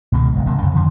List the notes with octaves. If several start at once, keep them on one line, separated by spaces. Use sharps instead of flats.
C#2 B2 D#3 G#3
F#1 G#3
D#1 C3 F#3 A#3
F2 C#3
F2 D3 D#3 F3